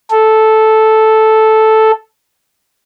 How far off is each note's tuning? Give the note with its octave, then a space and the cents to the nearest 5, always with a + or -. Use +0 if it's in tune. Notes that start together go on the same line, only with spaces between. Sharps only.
A4 -5